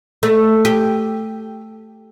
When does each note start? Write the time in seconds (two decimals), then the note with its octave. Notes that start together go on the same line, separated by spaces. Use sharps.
0.23 A3
0.65 G4